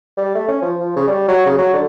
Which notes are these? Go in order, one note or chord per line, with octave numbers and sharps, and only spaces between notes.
G3
A3
C#4
F3
F3
C#3
G3
F#3
C#3
F#3
D3